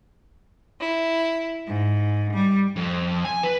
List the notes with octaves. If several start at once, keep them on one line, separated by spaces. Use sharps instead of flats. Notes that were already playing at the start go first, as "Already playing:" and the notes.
E4
G#2
G3
F2
G#5
B4